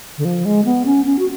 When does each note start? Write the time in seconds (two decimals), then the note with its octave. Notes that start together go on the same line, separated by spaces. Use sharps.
0.18 D3
0.25 F3
0.45 G#3
0.65 B3
0.86 C#4
1.05 C#4
1.19 F#4